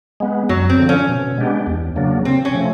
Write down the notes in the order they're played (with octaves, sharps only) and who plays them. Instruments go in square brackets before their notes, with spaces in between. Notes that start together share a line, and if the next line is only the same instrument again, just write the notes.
[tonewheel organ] G#3 B3
[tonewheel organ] F#2 [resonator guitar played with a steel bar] F#3
[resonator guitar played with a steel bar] C4
[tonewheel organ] D3 F3
[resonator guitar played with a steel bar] C#4
[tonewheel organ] B2
G#3 B3 D4 G4
E2
C#3 F#3 A#3 D4
[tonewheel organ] C3 [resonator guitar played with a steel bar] C4
[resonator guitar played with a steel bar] C#4
[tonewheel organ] F3 A3